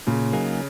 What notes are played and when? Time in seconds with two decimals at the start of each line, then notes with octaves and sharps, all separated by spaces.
0.07 A#2 C#3
0.33 F#3 A#3 D#4 G#4